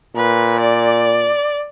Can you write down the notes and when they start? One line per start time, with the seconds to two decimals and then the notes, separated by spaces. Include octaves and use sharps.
0.15 A#2 B4
0.60 D5